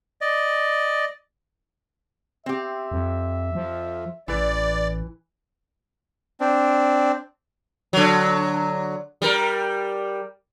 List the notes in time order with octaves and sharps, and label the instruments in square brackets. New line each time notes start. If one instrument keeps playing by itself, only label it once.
[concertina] D5 D#5
[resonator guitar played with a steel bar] C4 G4 [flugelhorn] E5
[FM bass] F2
[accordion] F2 [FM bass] F3
[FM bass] A1 [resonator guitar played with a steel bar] E3 B4 [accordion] D5
[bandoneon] C4 D4
[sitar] D3 F#3
G3 A#4